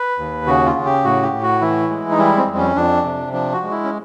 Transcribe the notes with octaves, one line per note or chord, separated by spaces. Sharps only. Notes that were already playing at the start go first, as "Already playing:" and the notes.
Already playing: B4
D#2
C#3 F#4
F4
C#3
G4
A2 F#4
G4
A2
F#4
E3 E4
G#3
D#4
G3 E4
C4
F2
C#4
F2 D4
C3
F3 D4
F#4
G#3
E4
C#4